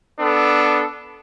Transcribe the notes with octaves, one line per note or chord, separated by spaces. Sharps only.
B3 D4 A4